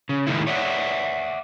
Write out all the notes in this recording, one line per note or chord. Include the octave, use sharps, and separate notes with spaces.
C#3
A2 D#3 G#3 A#3 D#4 E4
C#5 D5 E5 F#5